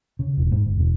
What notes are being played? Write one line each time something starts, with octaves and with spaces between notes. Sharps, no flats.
C#3
E1
G#2
G1
E1